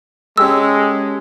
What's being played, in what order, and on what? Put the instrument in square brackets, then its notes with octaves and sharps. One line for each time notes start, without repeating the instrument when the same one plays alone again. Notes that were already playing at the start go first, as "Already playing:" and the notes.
[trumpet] G#3 [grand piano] C#4 G4 A4 [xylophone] E6